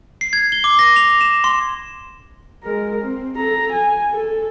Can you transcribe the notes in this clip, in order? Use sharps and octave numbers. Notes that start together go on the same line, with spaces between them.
C7
G#6
G7
D6
A#6
F7
E7
C6
G#3 A#4
C4
A4 A#5
G#5
A4